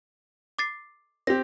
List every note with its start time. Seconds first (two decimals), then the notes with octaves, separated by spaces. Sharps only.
0.59 D6 A6 C7
1.27 C4 G4 A#6